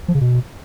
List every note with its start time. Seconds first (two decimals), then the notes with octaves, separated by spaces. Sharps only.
0.08 F3
0.15 C#3
0.21 B2